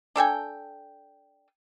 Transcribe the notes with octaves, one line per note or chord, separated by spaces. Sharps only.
D4 A4 G5 G#5